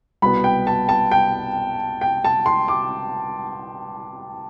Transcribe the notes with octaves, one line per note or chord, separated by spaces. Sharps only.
C2 B2 B3 B5
G5
A5
A5
G5
G5
A5
C6
D6